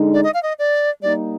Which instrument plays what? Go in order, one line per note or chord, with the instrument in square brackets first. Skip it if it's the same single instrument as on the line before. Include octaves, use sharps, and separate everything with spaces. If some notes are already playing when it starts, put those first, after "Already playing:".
Already playing: [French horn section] D3 G#3 D#4
[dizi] D5
D#5
F5
D#5
D5
[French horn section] G3 A#3 D#4 [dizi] D5